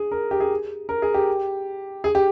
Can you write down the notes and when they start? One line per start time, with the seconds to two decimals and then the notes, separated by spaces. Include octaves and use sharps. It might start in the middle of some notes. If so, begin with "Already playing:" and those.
Already playing: G#4
0.11 A#4
0.31 G4
0.40 G#4
0.89 A#4
1.02 G#4
1.14 G4
2.04 G#4
2.15 G4